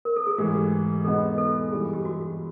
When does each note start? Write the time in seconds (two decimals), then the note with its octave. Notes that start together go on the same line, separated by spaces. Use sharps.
0.05 A#4
0.16 A4
0.27 G#4
0.38 G#2 E3 A3 G4
1.04 E2 B2 G#3 B3 D#4 A4
1.38 A4
1.71 G2 E3 G3 G#4
1.93 G4
2.05 F#4